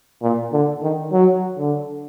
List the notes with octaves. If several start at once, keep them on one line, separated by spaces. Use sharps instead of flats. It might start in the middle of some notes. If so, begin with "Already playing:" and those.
A#2
D3
D#3
F#3
D3